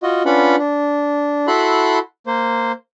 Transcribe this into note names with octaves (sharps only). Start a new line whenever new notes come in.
F4 F#4 D#5
C#4 D4 F4 B4 F#5 B5
D4
E4 F#4 A4 B5 C6 F#6
A#3 C5